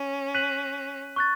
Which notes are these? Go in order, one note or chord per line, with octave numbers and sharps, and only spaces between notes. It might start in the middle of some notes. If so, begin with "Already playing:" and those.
Already playing: C#4
F#6 B6 D#7 F#7
C#6 F#6 A6